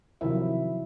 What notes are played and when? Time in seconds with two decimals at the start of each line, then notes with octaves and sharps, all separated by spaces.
0.21 C3 D#3 F3 F#3 E4 E5